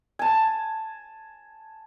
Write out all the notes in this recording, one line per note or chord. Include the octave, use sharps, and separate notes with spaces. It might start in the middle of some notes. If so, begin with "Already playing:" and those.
G#5 A5